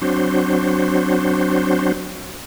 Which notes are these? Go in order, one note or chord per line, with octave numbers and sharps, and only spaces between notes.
F#3 C4 D4 F#4 C5